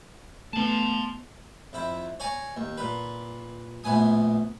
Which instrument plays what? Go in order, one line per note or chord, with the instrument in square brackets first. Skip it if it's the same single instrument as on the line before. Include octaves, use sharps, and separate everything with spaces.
[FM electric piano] A3 B3 [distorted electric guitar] A5 C6
[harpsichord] F2 E4
C#5 D5 G#5 A#5
D#2
A#2 B4
A#1 A2 B3 G#5 D#6